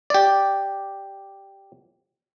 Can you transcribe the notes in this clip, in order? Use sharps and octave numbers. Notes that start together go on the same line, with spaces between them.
G4 D5